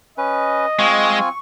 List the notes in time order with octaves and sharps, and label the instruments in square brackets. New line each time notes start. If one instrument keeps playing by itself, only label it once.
[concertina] C#4 B4 [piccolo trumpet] D#5
[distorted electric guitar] G#3 [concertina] C4 F4 G#5 [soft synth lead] C#6